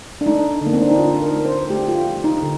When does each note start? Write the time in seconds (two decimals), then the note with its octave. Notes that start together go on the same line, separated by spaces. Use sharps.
0.21 D4
0.26 A3 D#4
0.61 D3
0.66 A#3
0.73 C4
0.82 D4
0.91 D#4
0.98 D3 F4
1.22 A#4
1.34 A3
1.45 C5
1.70 A3 G4
1.83 G4
1.88 F4
2.06 A3
2.24 D#4
2.42 D3